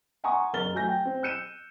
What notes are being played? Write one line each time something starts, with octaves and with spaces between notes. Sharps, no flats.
F#5 G#5 A#5 C6 C#6 D#6
F#1 A#4 F6 A6 G7
F#3 A3 G#5 G6 A#6
G5
C4
E6 F#6 G6 C#7 D#7 E7